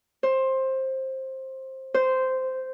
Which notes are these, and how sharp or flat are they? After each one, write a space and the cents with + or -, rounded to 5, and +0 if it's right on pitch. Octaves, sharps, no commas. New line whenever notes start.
C5 +15
C5 -10